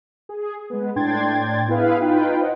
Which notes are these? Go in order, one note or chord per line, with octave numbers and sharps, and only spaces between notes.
G#4
G#3 B3
A2 D4 G5 C6 G#6 A6
B3 E4 G#4 B4 F5
D#4 F4 B4 G5
C5 D#5 F#5